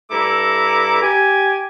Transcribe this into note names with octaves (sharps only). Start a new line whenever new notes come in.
G2 E4 A4 A#5 D6
G4 G#5